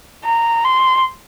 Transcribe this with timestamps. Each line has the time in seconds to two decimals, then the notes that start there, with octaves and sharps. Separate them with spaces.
0.25 A#5
0.64 C6